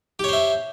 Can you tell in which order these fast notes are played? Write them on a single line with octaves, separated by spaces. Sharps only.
G4 C#5 C5 E5